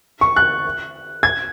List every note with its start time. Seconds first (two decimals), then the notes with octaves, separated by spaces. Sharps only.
0.21 C#6
0.36 F#6
1.23 G#6